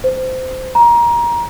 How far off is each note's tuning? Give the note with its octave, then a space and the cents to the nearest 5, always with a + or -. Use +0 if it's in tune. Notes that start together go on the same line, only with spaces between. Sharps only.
C5 -20
A#5 +25